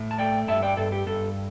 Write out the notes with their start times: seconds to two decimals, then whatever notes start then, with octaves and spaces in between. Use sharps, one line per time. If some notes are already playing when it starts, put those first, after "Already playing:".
Already playing: A2
0.11 A5
0.18 A3 D5 G5
0.48 G2 E5 A5
0.62 D5 G5
0.77 G2 A4
0.92 G4
1.07 G2 A4